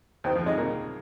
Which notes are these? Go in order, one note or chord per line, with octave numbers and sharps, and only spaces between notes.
D#2 D#3 C5
F2 F3
G#2 G#3 D#5
A#2 A#3